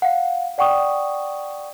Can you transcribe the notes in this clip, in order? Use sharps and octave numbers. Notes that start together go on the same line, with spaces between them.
F5 F#5
D5 F#5 G5 C#6 D#6